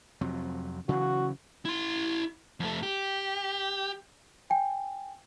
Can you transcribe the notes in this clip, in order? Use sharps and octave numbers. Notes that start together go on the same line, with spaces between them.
F2 C3 F#3
C#3 E3 F#3 F#4
E4 C6
F2 A3
G4
G5 G#5